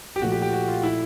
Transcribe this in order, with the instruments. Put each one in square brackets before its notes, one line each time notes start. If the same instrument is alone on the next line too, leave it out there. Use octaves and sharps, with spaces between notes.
[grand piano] G4
[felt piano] A#2 F3 A3 [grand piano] F#4
[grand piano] G4
G4
F#4
F4
E4